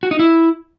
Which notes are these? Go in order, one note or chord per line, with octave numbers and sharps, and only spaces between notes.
F#4
D#4
E4